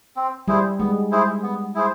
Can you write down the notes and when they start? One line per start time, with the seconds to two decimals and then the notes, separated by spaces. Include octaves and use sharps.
0.16 C4
0.48 G3 E4 G#4 C5
0.80 G#3 B3
1.11 E4 G#4 C5
1.43 B3
1.75 E4 G#4 C5